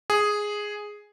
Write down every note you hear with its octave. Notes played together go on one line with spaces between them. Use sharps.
G#4